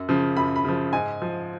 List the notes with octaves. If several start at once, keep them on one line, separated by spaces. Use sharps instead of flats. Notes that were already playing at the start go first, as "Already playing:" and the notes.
Already playing: F#2
C#3 F3
F#2 B5
B5
C#3 F3
G#2 G#5
F3